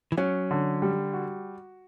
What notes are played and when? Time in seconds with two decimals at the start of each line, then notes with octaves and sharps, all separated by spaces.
0.12 E3
0.17 F#3 C#4
0.51 D3
0.82 G3
1.14 F#4